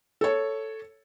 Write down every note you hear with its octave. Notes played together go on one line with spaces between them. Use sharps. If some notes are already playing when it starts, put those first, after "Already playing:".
A4 C#5